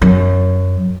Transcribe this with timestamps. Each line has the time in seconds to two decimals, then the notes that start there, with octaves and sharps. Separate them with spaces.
0.02 F#2